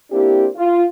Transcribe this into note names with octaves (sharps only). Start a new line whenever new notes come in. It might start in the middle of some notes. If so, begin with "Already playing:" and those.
A#3 C4 D4 E4 G4
F4